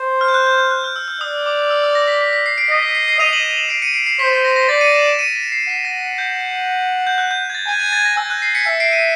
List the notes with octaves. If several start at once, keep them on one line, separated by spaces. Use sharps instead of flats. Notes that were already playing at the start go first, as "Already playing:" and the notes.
Already playing: C5
F6
G6
F#6
G6
G6
F#6
F6
E6
E6
D5 D#6
D6
E6
E6
A#6
B6
B6
B6
C7
C7 D7
D#5 C7
B6
C7
C7
D#5 D#7 F7
E7 F#7
E7 F#7
C7 D7
C#7 D#7
C7 D7
C7
C5 B6
A6
A#6
A#6
D5 A6
C#7 D#7
D7 E7
D7 E7
C#7 D#7
B6
C7
F#5 B6
A#6
G6
G6
F#6
G6
G#6
A6
G#5 G#6
G#6
A6
A#6
G#5 E6
F#6
C7
B6 C#7
E5 B6 C#7
C7 D7
C#7 D#7